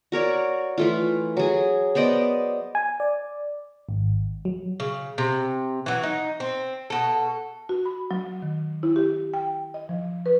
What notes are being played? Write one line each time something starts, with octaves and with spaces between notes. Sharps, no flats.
F#4 A#4 C#5 D5
E3 A3 F4
F#3 G#4
B3 C5 D5 D#5
G#5
D5
G#1
F#3
C#3
C3
E3 F#3
D#4
C4
B2 A4
F#4
B5
F#3
D#3
E4
G4
G5
D#5
F3
B4